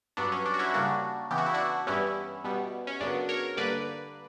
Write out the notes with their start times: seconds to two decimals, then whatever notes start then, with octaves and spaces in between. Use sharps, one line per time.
0.17 G2 F#3 B3 D4
0.32 C#4
0.45 D4
0.54 F#4
0.59 C#4 E4
0.74 C#3 G3 A#3 D4 F#4
1.31 C#3 E3 B3 G4
1.38 F#4
1.46 E4
1.54 D4 F#4
1.87 G2 E3 G3 B3 C#4 E4
2.44 B2 G3 B3
2.87 C#4
3.01 F#2 C#3 F#3 B3 D4
3.29 A#4 C#5
3.57 G2 D3 A#3 B4 D5